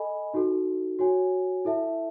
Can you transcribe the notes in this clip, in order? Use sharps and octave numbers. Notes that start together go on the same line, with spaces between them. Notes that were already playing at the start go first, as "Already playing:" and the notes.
Already playing: A4 D#5 G#5 B5
D#4 F#4 A4
F#4 C#5 G#5
E4 A4 E5 A5